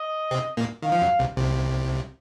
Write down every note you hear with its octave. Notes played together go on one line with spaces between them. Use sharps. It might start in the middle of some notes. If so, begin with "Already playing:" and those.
Already playing: D#5
C3 C4
A#2 A#3
D#3 F5
F3
F#2 F#3
C2 C3
C2 C3